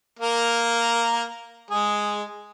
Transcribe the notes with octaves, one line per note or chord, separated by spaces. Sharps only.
A#3 A#4
G#3 G#4